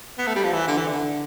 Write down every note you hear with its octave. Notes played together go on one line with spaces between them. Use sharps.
B3
A3
G3
F3
E3
D3
E3
D3